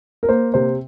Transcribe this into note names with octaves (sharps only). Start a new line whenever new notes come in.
A#4
A#3 C5
C3 C5